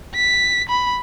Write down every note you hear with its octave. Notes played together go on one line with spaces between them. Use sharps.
B6
B5